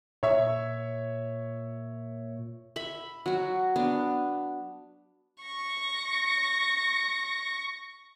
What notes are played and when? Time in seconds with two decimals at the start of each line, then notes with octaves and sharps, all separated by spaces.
0.23 A#2 C#5 E5
2.76 E5 B5
3.26 F#3 F#4
3.76 B3 D4
5.44 C#6 A#6